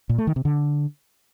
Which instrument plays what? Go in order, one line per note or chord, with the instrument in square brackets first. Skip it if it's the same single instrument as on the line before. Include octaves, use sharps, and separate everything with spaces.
[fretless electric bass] A#2
A3
D#3
C3
D3